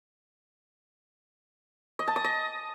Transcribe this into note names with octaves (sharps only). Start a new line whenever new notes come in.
D#5
A5
D#6
D#5